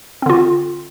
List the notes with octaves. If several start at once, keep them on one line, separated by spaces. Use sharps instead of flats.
D3 C4 F4